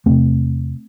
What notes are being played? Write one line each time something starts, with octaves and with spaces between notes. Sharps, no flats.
E2 C3 A3 C4